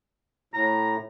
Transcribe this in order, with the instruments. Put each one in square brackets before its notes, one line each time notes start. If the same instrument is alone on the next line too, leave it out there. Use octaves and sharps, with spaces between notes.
[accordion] A2 [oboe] A#5